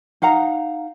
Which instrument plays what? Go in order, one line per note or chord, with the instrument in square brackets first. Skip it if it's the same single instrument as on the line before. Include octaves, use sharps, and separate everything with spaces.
[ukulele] D#4 F5 F#5 A#5